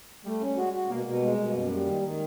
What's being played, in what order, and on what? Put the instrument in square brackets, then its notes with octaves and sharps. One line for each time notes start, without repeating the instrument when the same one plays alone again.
[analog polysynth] G3 [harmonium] A3
[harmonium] C#4
[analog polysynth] G#3 [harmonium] F#4
[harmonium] F#4
[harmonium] B2 [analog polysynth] A#3
[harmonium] B2
G#3
B2
F#2
G3
D#3
D#3